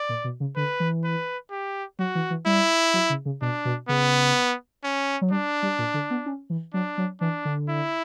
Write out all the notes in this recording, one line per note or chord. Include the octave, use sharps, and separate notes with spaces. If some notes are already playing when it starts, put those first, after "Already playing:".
Already playing: D5
A#2
B2
C#3
D3 B4
E3
B4
G4
F#3 F#4
E3
E3
G3 E4
F#3
C#3
C#3
B2 D4
B2
C#3 B3
C#4
F#3
G3 D4
G3
A#2
D3
B3
C#4
E3
F#3 D4
F#3
E3 D4
D3
E4